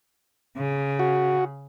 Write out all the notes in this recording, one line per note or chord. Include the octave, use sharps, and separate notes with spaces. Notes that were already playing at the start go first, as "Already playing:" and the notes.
C#3
F#4